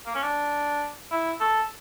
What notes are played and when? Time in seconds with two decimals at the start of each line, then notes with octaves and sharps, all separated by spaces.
0.06 A#3
0.15 C#4
0.23 D4
1.11 E4
1.40 A4